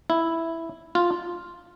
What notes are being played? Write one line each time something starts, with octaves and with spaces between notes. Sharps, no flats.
E4
F4